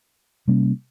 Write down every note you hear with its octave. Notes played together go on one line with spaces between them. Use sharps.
C3 G3 A#3 C#4